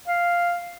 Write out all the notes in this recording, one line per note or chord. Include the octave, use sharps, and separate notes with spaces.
F5